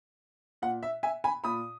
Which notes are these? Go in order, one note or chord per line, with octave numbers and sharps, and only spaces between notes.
A#2 F#5
E5
E5 G#5
G#5 B5
A#2 B5 D#6